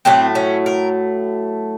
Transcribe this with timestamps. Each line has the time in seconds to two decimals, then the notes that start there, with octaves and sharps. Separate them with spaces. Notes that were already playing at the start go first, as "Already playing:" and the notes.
0.05 A2 F#3 A3 C4
0.35 C#4
0.66 A#4